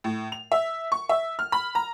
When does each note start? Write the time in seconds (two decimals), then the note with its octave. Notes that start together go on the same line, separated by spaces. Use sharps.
0.04 A2
0.32 F7
0.52 E5
0.92 C#6
1.09 E5
1.39 F6
1.52 B5
1.75 A#5